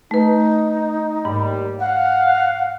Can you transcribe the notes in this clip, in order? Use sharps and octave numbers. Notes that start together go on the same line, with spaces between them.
A3 D#4 B4
D#2 G#2 G3
F5 F#5